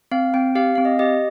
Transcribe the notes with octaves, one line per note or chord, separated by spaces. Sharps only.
C4 F5
C4 G5
G4 F5
C4 F5
D#5
G4 D#5